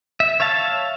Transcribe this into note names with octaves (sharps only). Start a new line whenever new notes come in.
E5
C#5 E5 F5 A5